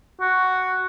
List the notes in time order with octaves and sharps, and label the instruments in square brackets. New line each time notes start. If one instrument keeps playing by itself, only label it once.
[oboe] F#4